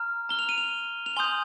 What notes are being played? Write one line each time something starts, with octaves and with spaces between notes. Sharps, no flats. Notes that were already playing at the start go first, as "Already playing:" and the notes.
Already playing: A#5 F6
A#5 F6 G7
F7
D#7
F7
F7
G#5 C6 D#6 G6 G7